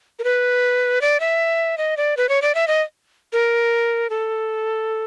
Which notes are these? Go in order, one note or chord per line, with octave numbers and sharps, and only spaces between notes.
A#4
B4
D5
E5
D#5
D5
B4
C#5
D5
E5
D#5
A#4
A4